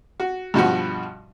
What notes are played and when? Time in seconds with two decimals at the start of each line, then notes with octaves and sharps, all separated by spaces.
0.20 F#4
0.54 G2 B2 F3 F#4